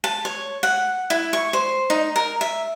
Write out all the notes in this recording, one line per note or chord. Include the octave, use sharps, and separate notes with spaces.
A5
C#5
F#5
E4
C#6
C5
D#4
A#4
E5